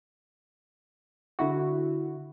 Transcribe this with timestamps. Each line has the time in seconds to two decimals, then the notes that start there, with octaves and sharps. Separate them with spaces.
1.39 D3 E4 F#4